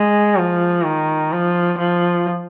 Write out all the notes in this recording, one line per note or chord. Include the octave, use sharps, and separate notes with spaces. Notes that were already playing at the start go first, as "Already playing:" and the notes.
Already playing: G#3
F3
D#3
F3
F3